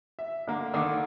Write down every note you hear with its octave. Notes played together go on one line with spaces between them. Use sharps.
E5
D3 A#3
D3 D#3 A#3